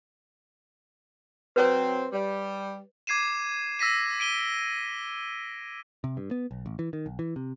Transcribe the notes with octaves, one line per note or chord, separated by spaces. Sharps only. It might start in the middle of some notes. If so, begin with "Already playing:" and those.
F#3 C4 B4 C#5
G3
D6 G#6 C7 D#7 E7
E6 A#6 B6 D#7
D7 D#7 G7
C3
G2
B3
B1
A1
E3
D#3
B1
E3
C3